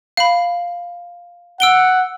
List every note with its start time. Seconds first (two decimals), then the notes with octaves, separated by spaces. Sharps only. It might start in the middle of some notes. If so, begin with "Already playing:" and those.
0.17 F5 B5
1.60 F#5 E6 D7 G7